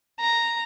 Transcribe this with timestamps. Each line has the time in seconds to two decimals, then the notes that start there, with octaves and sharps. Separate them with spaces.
0.21 A#5